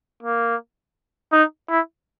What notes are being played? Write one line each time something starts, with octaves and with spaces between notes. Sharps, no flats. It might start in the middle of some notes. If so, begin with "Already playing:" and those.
A#3
D#4
E4